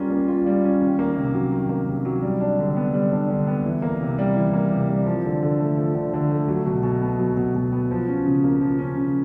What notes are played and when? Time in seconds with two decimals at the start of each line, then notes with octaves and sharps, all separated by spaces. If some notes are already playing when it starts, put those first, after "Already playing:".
Already playing: G3 A#3 C#4 F4
0.10 A#3
0.28 F4
0.46 G3
0.64 C#4
0.81 D#3
0.99 A#3
1.17 C3
1.34 F#3
1.52 D#3
1.69 A#3
1.88 C3
2.05 F#3
2.23 G3
2.41 D4
2.59 D3
2.76 B3
2.94 G3
3.12 D4
3.30 D3
3.47 B3
3.65 E3
3.82 A#3
4.01 C3
4.18 G3
4.36 E3
4.53 A#3
4.71 C3
4.88 G3
5.06 F3
5.25 D3
5.43 D3
5.60 A3
5.77 F3
5.95 D3
6.13 D3
6.31 A3
6.48 F#3
6.66 B2
6.83 B2
7.02 B3
7.19 F#3
7.37 B2
7.55 B2
7.72 B3
7.91 F3
8.08 C#4
8.26 C#3
8.44 A#3
8.61 F3
8.79 C#4
8.97 C#3